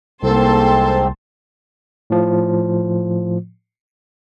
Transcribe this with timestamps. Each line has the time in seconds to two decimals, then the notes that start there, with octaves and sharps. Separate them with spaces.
0.23 C2 G#2 A#3 C4 A4 A5 C6
2.10 A2 F3